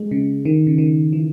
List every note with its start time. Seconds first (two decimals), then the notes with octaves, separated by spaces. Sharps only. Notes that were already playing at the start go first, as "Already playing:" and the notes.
Already playing: G#3
0.11 C#3
0.45 D#3
0.67 C#3
0.78 D#3
1.13 E3